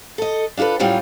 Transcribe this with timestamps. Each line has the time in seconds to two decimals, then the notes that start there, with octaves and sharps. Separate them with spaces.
0.18 A4 D#5
0.57 D4 F4 F#4 A4 B4
0.79 A2 F#3 G3 C#4 F4